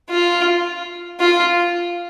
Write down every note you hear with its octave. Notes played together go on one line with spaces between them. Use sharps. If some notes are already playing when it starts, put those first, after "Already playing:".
F4
F4